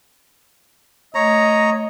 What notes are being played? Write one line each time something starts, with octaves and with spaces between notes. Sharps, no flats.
A3 C#5 D#5 A#5